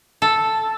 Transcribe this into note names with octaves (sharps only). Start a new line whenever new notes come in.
A4